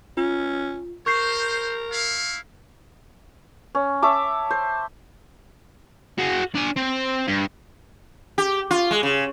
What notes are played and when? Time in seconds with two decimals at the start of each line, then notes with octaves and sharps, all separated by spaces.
0.17 C#4 F4
1.06 A#4 C5 C#6 G6 C7
1.91 E4 F5
3.75 C#4
4.02 C#5 E5 A5 D6
4.51 C5
6.18 F#4 G#4
6.55 D4 G#5
6.77 C4
7.28 G2
8.38 G4
8.71 F4
8.91 G#3
9.03 C#3